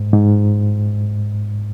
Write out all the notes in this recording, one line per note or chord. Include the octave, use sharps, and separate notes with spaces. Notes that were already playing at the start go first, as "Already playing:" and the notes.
Already playing: G#2
G#2